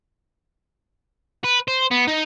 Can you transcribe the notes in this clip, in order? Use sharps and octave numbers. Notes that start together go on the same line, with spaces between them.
B4
C5
B3
D#4